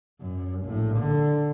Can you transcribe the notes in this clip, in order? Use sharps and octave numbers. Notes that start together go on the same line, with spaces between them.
F#2
A#1 A2
D3